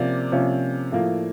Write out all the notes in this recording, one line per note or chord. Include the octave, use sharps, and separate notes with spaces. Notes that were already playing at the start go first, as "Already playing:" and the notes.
Already playing: C3 F3 A#3 C#4 D5
C3 F3 A#3 C#4
A2 F3 A#3